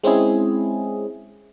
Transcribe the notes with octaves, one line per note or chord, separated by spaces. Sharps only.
G#3 C4 C#4 E4 G#4